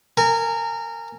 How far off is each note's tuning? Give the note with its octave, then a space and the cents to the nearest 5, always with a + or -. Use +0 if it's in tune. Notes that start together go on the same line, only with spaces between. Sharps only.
A#4 -25 G#5 +0